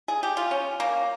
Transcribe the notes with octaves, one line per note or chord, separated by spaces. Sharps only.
G#4
G4
F4
C#4
A#3